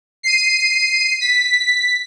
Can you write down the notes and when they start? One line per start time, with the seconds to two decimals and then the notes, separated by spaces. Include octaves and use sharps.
0.23 C7 D#7
1.21 B6